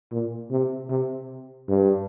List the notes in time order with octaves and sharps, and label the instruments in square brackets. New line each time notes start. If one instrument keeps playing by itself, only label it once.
[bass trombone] A#2
C3
C3
G2